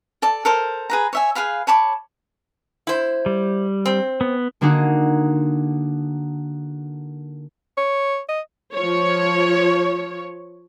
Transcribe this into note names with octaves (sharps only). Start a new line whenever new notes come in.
A4 D5 A5
A4 A#4 C5
G#4 B4 A#5
C#5 E5 G#5
G#4 B4 F5 B5
C#5 A5 B5 D6
E4 C5
G3
C4
B3
D3 A#3 D4 D#4 F#4 G#4
C#5
D#5
F3 C#5